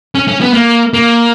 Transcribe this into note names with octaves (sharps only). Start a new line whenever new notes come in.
C#4
C#4
B3
A#3
A#3